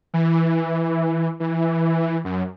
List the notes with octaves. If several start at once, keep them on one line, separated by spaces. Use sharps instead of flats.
E3
E3
F#2